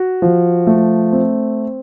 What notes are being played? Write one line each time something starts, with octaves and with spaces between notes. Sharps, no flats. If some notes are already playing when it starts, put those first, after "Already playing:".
Already playing: F#4
F3
A3
C4